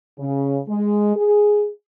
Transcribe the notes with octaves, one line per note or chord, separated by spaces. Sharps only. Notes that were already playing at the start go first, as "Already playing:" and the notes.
C#3
G#3
G#4